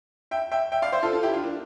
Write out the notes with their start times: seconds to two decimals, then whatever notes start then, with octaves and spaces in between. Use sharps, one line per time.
0.31 E5 G5
0.52 E5 G5
0.72 E5 G5
0.82 D5 F5
0.92 C5 E5
1.03 F4 A4
1.13 F4 A4
1.23 E4 G4
1.34 D4 F4
1.44 A#3 D4